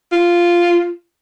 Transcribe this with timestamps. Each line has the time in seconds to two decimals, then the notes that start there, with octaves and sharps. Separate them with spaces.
0.12 F4